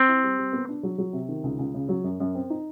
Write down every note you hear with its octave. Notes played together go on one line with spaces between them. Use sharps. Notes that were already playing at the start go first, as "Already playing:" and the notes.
Already playing: C4
E4
G3
G3
B3
D4
F#3
F#3
C3
D#3
C#2
C#2
C#3
F#3
F#2
F#2
C4
D#4